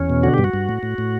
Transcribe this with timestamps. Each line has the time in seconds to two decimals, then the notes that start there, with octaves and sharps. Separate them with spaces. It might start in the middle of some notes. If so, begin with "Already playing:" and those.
Already playing: E2 C#4
0.10 B2
0.23 D3 F#4
0.34 G2 G4
0.44 F#4
0.54 G2
0.69 A2
0.83 A2
0.98 A2